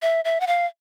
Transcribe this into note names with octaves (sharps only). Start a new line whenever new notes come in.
E5
E5
F#5
F5